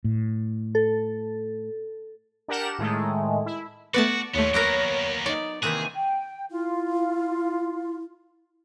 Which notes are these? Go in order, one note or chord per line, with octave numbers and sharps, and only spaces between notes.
A2
A4
D4 G4 A#4 F#5 E7
A2 D#3 G#3 A3
E4
A3 B3 F#4 B4 D5 F#5 A5
D#2 A3 B3 F4 C#5
F#3 A#3 B3 G4 A#4
D#4 C#5 D5
C3 D#3 E3 A#3 G#4 F#6 B6
G5
E4 F4